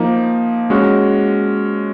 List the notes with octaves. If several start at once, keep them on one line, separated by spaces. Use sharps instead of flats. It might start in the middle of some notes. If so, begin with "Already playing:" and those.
Already playing: F3 A#3 D#4
G#3 C#4 F#4